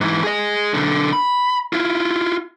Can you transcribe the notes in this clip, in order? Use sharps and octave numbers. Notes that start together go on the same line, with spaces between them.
G#2 E3
G#4 D#5
B1 D3
B5
E4 F4